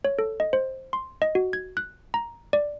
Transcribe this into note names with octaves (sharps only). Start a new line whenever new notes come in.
C#5
A4
D#5
C5
C6
D#5
F#4
G#6
F#6
A#5
D5